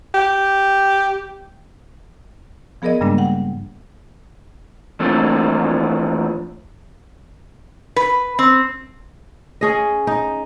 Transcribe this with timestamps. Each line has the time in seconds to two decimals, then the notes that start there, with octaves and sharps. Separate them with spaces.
0.14 G4
2.82 F3 B3 G#4 A#4 D5 D#5
3.01 G2 C#3 G3 G#3 A#3 D4
3.18 F#5 G5
5.00 E3 F3 A3 A#3 C4 D4
7.96 B4
8.39 C4
9.61 C#4 G#4 D#5
10.07 D#4